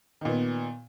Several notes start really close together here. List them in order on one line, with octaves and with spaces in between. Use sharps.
D#3 A#2 B3